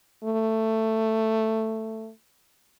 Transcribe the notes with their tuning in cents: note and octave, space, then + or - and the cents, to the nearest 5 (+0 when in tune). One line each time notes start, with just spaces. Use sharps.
A3 +10